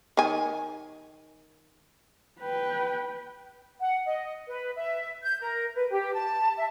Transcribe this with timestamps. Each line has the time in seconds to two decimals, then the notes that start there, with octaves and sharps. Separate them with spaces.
0.17 D#3 G#5
2.41 B4 G5
3.81 F#5
4.05 D#5
4.48 B4
4.75 E5
5.23 G6
5.42 A#4
5.74 B4
5.90 G4
6.14 A5
6.56 E5